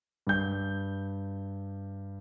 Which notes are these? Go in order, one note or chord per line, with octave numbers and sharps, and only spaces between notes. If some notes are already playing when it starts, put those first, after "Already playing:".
G2 G6